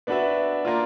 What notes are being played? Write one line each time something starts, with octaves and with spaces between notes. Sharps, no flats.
B3 D4 F#4 B4 E5
A#3 D4 F4